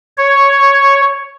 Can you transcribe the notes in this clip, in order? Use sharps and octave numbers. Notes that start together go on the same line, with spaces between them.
C#5